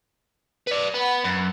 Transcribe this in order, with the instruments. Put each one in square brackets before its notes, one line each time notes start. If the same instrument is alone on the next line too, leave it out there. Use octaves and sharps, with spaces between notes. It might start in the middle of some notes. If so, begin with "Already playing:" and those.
[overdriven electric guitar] B4 D5
[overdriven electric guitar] B3 [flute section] F#5 B5
[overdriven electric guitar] F#2